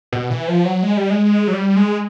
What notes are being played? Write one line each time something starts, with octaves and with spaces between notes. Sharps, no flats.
B2
E3
F3
F#3
G#3
G3
G#3
F#3
G3
G#3